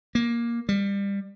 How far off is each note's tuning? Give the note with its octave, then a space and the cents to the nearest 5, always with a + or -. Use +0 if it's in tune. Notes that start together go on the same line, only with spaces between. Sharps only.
A#3 +10
G3 +25